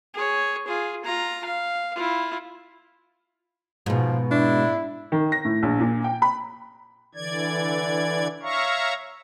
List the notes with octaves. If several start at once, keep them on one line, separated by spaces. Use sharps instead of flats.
G#4 C#5
F4 G#4
F4 A#5
F5
E4 F4
G#2 B2 F3
D4 E4
D#3
A#6
A2
A#1
A#2
G5
B5
D3 E3 D5 G#6
C#5 E5 F5 A#5 C#6